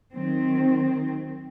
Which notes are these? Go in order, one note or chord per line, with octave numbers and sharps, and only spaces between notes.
D#3 F#3 C4